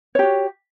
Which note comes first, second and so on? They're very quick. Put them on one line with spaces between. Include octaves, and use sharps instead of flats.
C#5 G4 F#4